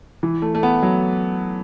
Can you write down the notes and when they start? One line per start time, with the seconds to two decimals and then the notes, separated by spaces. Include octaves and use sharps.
0.23 E3
0.42 A3
0.55 A3
0.63 B3
0.83 F#3